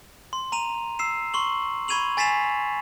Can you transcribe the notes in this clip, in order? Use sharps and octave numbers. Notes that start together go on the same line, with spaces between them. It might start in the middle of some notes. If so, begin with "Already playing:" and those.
C6
A#5 D#7 F7
E6 C7 E7
C6 C#6 F#7
B5 C#6 G#6 D#7 F7 F#7
G#5 A6 B6 C7 E7 F7